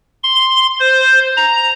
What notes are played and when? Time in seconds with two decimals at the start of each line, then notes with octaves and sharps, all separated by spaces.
0.24 C6
0.80 C5
1.37 A#5